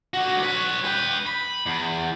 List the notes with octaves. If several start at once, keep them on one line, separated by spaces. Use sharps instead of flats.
D3 F#4
B4 C#5
B4 G5
B5
E2